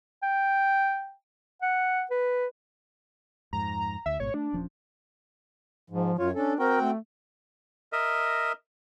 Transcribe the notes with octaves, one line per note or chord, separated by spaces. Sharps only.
G5
F#5
B4
F2 G#2 A#5
D2 E5
A1 G#2 B2 C#5
A3 D4
D#1 F3 C#4
G#2 F3
F#2 F4 C#5
C#4 D4 A4
C4 F#4 A#4 G5
A3
A#4 D#5 E5